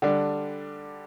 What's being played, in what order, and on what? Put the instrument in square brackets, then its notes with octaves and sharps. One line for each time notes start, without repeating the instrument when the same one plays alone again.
[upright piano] D3 G3 D4